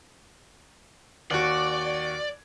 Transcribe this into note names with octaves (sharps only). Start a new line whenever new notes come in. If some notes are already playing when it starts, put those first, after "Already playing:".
D#2 F#4 D5